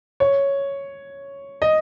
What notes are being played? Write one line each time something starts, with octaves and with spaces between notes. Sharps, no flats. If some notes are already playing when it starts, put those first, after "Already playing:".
C#5
D#5